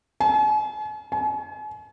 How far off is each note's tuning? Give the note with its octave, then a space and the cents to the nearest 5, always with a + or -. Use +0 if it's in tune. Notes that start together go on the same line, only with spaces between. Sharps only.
G#5 +45
G#5 +40